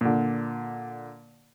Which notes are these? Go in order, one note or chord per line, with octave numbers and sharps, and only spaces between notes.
A#2 D3